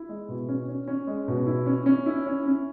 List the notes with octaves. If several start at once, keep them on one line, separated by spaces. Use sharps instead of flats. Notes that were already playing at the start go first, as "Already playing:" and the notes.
Already playing: E4
G#3
B2
C#4
C#4
C#4
G#3
B2
E4
C#4
C#4
E4
C#4
C#4